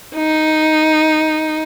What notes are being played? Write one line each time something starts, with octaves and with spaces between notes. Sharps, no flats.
D#4